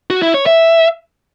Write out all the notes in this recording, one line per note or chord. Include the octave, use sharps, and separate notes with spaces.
F#4
E4
C#5
E5